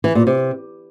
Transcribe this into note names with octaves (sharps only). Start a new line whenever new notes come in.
E3
A#2
C3